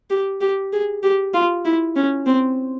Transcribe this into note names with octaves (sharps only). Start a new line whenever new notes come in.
G4
G4
G#4
G4
F4
E4
C#4
C4